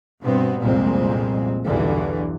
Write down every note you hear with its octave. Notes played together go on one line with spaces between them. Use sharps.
G2 B2 B3 C4
G1 C2 F2 A#2 G#3 C4
B1 E2 G2 D3 E3